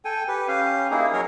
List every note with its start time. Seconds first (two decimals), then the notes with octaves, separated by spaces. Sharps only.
0.05 A4 G5 G#5
0.28 G4 B4
0.48 C#4 G4 F5
0.91 A#3 D#4 E4 G#4
1.13 F#3 A#4 C#5